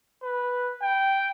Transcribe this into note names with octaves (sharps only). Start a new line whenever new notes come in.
B4
G5